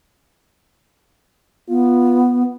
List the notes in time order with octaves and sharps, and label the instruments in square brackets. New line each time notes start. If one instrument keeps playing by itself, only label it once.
[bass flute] B3 [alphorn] F4